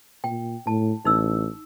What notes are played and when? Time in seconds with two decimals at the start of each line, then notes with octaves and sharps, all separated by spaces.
0.24 A#2 G5
0.67 A2 A5
1.05 A1 D#4 E6